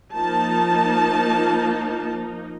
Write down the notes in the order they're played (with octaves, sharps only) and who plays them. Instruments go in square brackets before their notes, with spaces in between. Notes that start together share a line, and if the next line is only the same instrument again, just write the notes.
[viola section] F3 A#3 D#4 A5